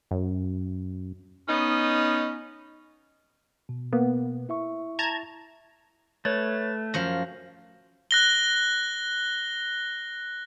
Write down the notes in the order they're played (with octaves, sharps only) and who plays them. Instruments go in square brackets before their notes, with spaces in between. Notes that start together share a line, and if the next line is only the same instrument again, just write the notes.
[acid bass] F#2
[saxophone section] B3 C#4 D#4
[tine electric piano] B2
[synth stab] A#3 B3
[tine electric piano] E4 E5 C#6
[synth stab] A5 A#5 G#6
[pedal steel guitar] A3 [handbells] B4 C#5 A6
[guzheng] F#2 F3 [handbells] A#6
[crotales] F#6 A#6 G7